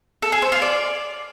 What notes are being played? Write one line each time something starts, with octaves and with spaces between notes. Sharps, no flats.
A4
G#4
C5
F4
D5